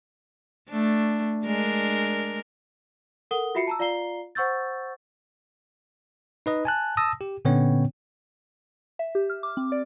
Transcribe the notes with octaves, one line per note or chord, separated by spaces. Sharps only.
A3 D4
G#3 D4 A#4
A4 A#4 F#5 D#6 G7
F4 F#4 E5 B5 C7 C#7
A5 A#5 E6
F4 D5 F5 A#5 C7 G7
C5 F#5 C#6 E6 G6 A6
D#4 B4 D#5
G#5 A5 F#6
A5 D#6 E6 A#6
G4
A#2 D3 B3 C#4 C#5 G5
E5
G4
F6
D6
C4
D5